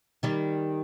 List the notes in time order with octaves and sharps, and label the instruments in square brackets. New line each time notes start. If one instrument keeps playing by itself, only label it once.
[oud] D#3 G3